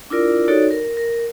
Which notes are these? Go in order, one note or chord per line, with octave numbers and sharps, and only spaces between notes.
D4 E4 F4 A#4 D5
D#4 F#4 A4 C#5 D5
A#4
A#4